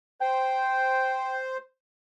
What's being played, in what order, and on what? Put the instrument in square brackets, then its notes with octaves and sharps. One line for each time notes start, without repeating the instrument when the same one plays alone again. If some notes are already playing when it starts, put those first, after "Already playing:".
[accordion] C5 [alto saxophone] G5